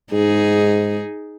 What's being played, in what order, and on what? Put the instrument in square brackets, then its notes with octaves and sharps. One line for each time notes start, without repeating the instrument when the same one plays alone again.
[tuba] G#2 [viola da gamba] D#4 G#4